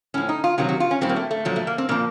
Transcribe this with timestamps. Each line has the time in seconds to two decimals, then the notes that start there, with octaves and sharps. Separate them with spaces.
0.14 A2 F3 C#4
0.29 D#4
0.44 F4
0.58 C3 D#3 F#3 F4
0.69 F#4
0.80 F4
0.91 C#4
1.01 A2 F#3 C4
1.09 A#3
1.16 A3
1.31 A3
1.45 A#2 F3 F#3
1.56 A3
1.67 A#3
1.78 C4
1.89 A#2 F3 A#3